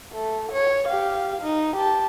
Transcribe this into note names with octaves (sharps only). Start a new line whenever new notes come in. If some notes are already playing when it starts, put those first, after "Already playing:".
A3
C#5
G4 F5
D#4
G4 A5